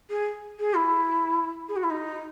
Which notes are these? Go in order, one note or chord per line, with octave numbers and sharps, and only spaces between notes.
G#4
G#4
E4
G#4
F#4
E4
D#4